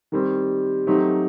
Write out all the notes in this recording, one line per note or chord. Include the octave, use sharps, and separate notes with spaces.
D#3 G3 C4
F#3 A3 C4 D#4 G4